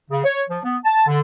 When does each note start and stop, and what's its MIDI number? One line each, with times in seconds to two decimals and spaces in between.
0.11 0.22 49
0.24 0.43 73
0.49 0.59 53
0.64 0.77 59
0.85 1.04 81
1.07 1.20 50